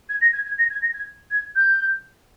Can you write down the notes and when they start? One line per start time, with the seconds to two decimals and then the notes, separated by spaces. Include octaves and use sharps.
0.09 G#6
0.21 A#6
0.33 G#6
0.46 G#6
0.58 A#6
0.70 G#6
0.82 A#6
0.94 G#6
1.31 G#6
1.55 G6